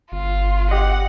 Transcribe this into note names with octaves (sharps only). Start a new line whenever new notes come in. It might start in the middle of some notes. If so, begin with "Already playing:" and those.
G1 F4
G4 D#5 F#5